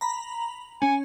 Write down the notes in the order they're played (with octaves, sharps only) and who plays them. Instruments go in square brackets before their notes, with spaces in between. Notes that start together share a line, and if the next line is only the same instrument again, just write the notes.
[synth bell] A#5 B5
[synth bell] C#4 [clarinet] G#5